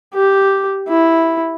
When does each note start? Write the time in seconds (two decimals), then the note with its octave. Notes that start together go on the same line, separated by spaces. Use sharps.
0.14 G4
0.88 E4